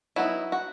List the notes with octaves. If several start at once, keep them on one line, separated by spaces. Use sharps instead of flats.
F#3 B3 D#4 E4
F#4